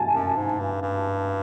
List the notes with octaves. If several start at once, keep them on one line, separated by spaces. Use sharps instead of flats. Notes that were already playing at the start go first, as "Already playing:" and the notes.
Already playing: G#5 A5
F#2
G#2
G2
G2